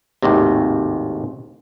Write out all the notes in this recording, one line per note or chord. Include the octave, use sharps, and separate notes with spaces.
G#1 D#2 A2 C3